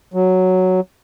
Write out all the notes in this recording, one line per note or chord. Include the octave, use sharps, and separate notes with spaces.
F#3